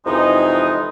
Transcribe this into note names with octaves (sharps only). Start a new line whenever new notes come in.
F2 C3 E3 G#3 D#4